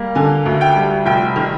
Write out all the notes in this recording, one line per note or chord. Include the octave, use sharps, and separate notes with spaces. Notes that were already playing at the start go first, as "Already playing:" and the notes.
Already playing: G3 A#3
D3 G#5
D2
G5
G3
F1 G5
D#3